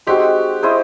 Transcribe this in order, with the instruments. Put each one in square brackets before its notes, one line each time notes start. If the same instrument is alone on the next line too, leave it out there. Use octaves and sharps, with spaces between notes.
[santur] G#3 C4 D#4 F#4 [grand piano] G4
[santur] E4 G#4 C5 D#5